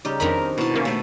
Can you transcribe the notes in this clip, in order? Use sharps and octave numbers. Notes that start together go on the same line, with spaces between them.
C#3 G3 D#4 G4
F2 D#3 C4 D4 D#4 A#4 B5
B2 E4 A5
C3 A#3 C#4
A3 A4